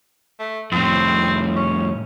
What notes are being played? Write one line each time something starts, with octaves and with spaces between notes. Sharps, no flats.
A3
F2 A2 C4
C#4